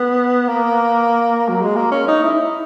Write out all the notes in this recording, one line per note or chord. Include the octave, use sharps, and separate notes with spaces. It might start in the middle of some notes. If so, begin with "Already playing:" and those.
Already playing: B3
A#3
F#3
G#3
A#3
C#4
D#4
E4